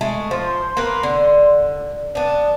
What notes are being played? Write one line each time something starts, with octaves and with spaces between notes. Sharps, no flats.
G#3 A3
F3 C6
A#3 A#4 B4
D3
B3 D4 A5